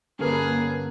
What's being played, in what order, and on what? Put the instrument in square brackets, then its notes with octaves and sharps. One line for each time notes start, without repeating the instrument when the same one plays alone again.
[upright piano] G2 D3 F6 [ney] A#3 [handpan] C#4 A#4 B4 [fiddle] G#4